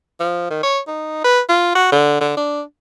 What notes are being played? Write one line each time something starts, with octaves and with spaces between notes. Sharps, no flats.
F3
D#3
C#5
D#4
B4
F4
F#4
D3
D3
D4